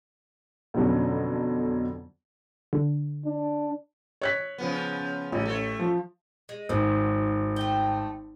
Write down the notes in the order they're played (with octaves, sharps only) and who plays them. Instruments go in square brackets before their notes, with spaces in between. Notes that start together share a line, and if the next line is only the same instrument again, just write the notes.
[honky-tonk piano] F2 B2 D3 F#3 C#4
[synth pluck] D3
[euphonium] D4
[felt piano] C#5 F#6 B6
[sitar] C#3 F3 B3
[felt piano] A1 [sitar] C#3
[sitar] A3 C#5
[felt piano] F3
[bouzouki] G#3
[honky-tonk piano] G#1 [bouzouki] D#3 F#3
[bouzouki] A3 G5